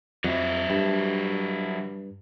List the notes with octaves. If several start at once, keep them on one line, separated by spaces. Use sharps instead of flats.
F2 F#3 E4
G2